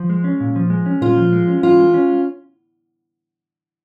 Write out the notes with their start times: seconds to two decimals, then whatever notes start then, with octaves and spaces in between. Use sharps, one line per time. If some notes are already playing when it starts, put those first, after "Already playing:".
Already playing: F3
0.10 G#3
0.24 C#4
0.40 A#2
0.56 F3
0.70 G#3
0.86 C#4
1.01 A#2 F4
1.17 F3
1.33 G#3
1.48 C#4
1.63 E3 F4
1.79 G#3
1.94 C#4